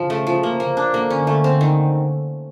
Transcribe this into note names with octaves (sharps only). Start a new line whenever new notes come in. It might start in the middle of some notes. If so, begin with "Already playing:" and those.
Already playing: C#3 F3
A3
F3
A#3
A#3
D4
D3 A#3
C#4
A3
C4
D#3